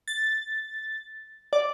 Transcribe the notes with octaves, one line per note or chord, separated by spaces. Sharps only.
A6
D5